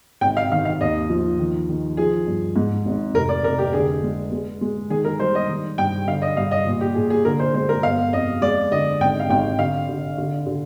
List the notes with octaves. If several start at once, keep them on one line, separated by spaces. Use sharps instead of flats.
G#1 G5
F5
D#3 F5
F5
D#2 D#5
F3
D#3
D#3
F3 G#4
G2
G#2
G#1
F1 A#4
D5
F1 A#4
G4
D3 G#4
G#3
G#3
G#3
D#3 G#4
A#4
G3 C5
D#5
D#3
G2 G5
D3 F5
D#5
G2 F5
D#5
A#2
G4
A#2 G#4
G#4
D3 A#4
C5
G#3 C5
A#4
G1 F5
F2 D#5
G#3 D5
D3 D#5
G#1 G5
F5
G#1 G5
D3 F5
D3
D3
D3